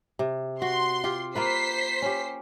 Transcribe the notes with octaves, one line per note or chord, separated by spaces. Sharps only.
C3
F#4 C6
F4 G4
A#3 F4 B4 C5 B6 C7
C#4 G4